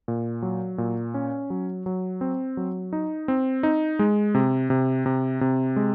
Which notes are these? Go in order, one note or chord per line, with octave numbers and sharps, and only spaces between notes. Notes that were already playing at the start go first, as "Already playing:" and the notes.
A#2
F#3
A#2
C#4
F#3
F#3
C4
F#3
D#4
C4
D#4
G#3
C3
C3
C3
C3
G#3